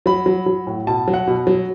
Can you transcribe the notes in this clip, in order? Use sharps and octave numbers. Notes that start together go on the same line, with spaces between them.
F#3 B5
F#3
F#3
A2
B2 A5
F#3
F#5
B2
F#3